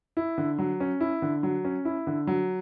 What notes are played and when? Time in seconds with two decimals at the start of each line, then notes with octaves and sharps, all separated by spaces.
0.17 E4
0.38 D3
0.59 F#3
0.80 C#4
1.00 E4
1.22 D3
1.43 F#3
1.65 C#4
1.85 E4
2.07 D3
2.27 F#3